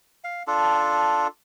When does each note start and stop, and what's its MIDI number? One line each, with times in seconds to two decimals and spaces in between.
0.24 0.43 77
0.47 1.27 62
0.47 1.27 65
0.47 1.27 69